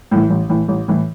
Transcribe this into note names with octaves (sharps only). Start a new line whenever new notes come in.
A2 E3
A1
A2 E3
A1
A2 E3